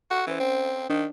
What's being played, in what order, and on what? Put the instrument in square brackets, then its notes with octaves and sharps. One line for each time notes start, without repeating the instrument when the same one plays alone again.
[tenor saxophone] F#4 [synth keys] A4
[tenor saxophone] E3 [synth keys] C#4 C5
[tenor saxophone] C4
[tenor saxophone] D#3 [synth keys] D4